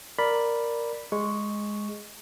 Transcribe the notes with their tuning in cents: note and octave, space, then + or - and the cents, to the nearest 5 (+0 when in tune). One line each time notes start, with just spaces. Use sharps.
A#4 +0 D5 +0 B5 +0
G#3 +0 C#6 +0